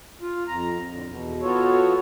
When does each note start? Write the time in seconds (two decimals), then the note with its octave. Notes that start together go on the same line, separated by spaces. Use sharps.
0.22 F4
0.48 F2 A#5
0.92 A2 D3
1.07 E2 B2
1.42 B3 F4 F#4 A4 C#5